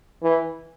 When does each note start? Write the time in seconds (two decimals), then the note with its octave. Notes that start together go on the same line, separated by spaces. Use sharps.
0.22 E3